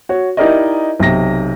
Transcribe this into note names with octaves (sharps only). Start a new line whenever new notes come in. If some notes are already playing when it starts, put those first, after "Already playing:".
F#4 C#5
D#4 E4 G4 A#4 D5 D#5
B1 C3 A#6